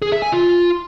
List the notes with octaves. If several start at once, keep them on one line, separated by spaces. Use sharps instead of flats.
G#4
E5
G#5
F4